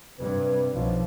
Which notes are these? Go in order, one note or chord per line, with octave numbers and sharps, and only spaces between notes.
G2 C3 B4
B1 F3